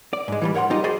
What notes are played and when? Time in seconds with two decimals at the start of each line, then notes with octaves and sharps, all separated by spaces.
0.13 D5
0.28 G#2 G#3
0.42 E3 F3 G3
0.54 A#4 C#5 F#5 G5 C6
0.70 F#3 G3 D#4 F4 G4
0.84 F#4 G#4 C5 D5 D#5